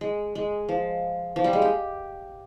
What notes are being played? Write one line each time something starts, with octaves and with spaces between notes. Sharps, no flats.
G#3
G#3
F3
F3
G3
G#3
G4